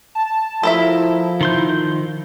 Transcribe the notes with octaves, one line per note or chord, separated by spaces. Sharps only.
A5
F3 E4 A4 A#4 E5
D#3 C6 G6